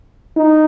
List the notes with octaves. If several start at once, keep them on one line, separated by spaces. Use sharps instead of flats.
D#4